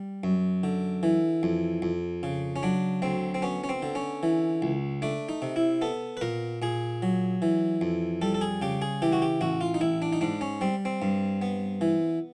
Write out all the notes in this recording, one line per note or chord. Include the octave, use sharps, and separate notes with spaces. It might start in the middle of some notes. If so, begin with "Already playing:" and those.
Already playing: G3
F#2
D3
E3
F2
F2
C#3
C#4
F#3 D4
D2 C4
C4
B3 C#4
C#4
C4
D3
C#4
E3
C#2
A3 D4
D#4
C3
E4
B3 A4
B4
A#2 A#4
A#2 G#4
F#3
E3
F2
G3 A4
A4
G#4
C#3 G4
G#4
E3 G4
F#4
G4
A1 F#4
F4
D#4
A1 E4
D4
D#4
G#2 D4
C#4
G3 C4
C4
G2
B3
E3